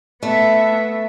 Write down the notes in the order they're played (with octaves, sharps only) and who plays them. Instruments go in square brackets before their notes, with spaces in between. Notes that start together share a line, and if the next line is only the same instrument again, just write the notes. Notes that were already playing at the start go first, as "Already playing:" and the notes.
[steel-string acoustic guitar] A3 [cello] B3 E5